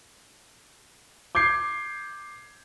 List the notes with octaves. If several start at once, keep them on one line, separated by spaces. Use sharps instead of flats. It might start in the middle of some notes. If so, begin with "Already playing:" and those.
D6 G6 G#6 C7